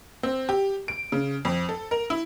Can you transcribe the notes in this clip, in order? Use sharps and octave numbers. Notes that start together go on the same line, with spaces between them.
C4
G4
D7
C#3
F2
A4
A#4
E4